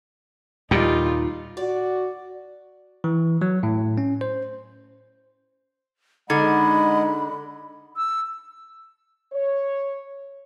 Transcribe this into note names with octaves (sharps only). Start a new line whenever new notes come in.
D#2 A#2 G3 D#4 F4
F#4 D5
E3
F#3
A2
C#4
C5
D3 G#3 D#4 D#5 F#5 B5 G#6
E6
C#5